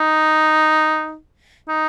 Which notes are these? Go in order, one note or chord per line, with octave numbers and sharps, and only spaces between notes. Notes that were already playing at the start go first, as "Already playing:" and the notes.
Already playing: D#4
D#4